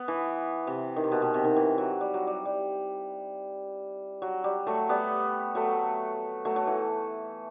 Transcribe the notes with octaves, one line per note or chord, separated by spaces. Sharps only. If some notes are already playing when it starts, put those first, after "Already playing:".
Already playing: B3
E3
C3
D#3
C3
B2
B2
C3
D#3
E3
F#3
G3
F#3
G3
G3
F#3
G3
F#3 A3
G3 B3
F#3 A3
F#3 A3
F#3
E3